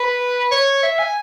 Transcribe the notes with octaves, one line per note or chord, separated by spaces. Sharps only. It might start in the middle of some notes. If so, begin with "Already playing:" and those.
Already playing: B4
C#5
E5
G#5